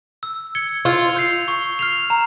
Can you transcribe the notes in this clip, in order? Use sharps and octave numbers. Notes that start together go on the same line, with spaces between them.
E6
G#6 C#7 G7
F4 E6
G6 C7 F7
C#6
F6 C7 F7
A#5